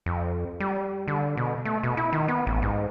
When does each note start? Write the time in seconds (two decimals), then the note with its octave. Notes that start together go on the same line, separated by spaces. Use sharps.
0.06 F2
0.60 G3
1.08 D3
1.37 B2
1.65 A3
1.83 B2
1.97 E4
2.13 D#3
2.28 B3
2.47 A1
2.62 G#2